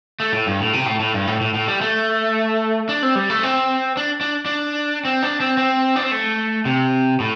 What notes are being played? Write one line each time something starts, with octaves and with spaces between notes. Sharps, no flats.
A3
A2
G2
A2
C3
A2
A2
G2
A2
A2
A2
G3
A3
D4
C4
G3
A3
C4
D4
D4
D4
C4
D4
C4
C4
D4
C4
A3
C3
A2